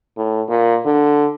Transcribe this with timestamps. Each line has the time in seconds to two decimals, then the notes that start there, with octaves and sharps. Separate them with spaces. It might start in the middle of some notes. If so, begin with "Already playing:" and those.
0.17 A2
0.49 A#2
0.85 D3